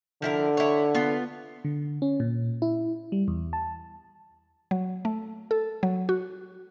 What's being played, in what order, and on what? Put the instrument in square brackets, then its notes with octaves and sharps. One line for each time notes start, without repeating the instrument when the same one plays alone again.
[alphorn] D3 [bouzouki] F3 E4 A#4
[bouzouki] E4 C#5
B3 F4
[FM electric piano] D3
C#4
A#2
E4
G3
E2
A5
[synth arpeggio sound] F#3
A3
A4
F#3
F#4